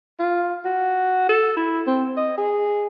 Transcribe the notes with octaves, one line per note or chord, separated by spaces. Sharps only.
F4
F#4
A4
E4
C4
D#5
G#4